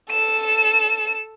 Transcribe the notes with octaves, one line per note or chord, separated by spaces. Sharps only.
A4 E7